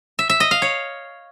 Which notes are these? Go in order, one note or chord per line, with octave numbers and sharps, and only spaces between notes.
E5
E5
D#5
F5
C#5